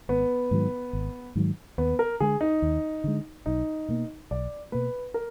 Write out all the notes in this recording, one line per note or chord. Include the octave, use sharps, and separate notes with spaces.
G#1 B3
G#2 D#3 F#3
G#1
G#2 D#3 F#3
D#2 B3
A#4
D3 G#3 G#4
D#4
D#2
D3 G#3
B1 D#4
B2 A#3
B1 D5
B2 A#3 B4
A#4